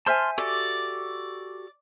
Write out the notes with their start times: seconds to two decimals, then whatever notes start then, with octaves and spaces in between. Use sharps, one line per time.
0.06 C5 E5 G#5 A5 C6 F6
0.38 F#4 G4 A4 D5